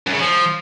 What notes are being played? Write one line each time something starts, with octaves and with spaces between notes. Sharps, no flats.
F#2
C#3
F3